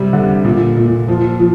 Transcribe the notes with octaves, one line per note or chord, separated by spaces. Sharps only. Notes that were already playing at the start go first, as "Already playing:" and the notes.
Already playing: C3 G3
D3
A#2
A#2
F3
F3